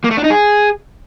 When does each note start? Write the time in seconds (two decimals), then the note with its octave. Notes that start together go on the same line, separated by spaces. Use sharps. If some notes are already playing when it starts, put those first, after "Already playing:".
0.04 A#3
0.11 A3
0.17 D4
0.24 D#4
0.30 G#4